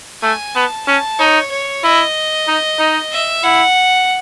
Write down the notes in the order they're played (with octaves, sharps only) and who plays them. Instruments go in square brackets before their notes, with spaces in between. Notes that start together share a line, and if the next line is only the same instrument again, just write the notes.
[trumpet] A3 [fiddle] G#5
[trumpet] B3 [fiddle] A5
[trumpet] C#4 [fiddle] A5
[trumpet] D#4 [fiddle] C#5
[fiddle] C#5
[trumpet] E4 [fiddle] D#5
[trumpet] D#4
D#4
[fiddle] E5
[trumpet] E4 [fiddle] F#5